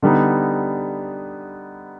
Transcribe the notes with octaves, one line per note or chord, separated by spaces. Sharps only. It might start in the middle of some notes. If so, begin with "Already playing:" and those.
D3 G3 B3 D#4